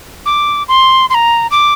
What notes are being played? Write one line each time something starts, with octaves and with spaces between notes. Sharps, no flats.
D6
C6
C6
A#5
D6